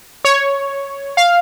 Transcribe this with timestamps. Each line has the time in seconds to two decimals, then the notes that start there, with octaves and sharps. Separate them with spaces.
0.25 C#5
1.17 F5